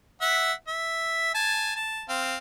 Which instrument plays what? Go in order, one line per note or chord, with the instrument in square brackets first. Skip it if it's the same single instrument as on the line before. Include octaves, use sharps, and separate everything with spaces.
[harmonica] E5 F#5
E5
G#5 A5
A5
C4 F5